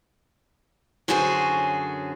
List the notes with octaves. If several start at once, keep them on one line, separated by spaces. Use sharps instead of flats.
F#2 D3 C#4 F#4 G#4 C5